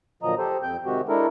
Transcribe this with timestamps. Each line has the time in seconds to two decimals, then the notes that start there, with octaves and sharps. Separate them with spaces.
0.23 A#2 D3 F3 F#3 D#5 A#5
0.38 G4 A4 C5
0.63 F2 C4 G5 G6
0.86 C3 D#3 G#3 C4 F#4 G4
1.09 G#3 D4 E4 A4 A#4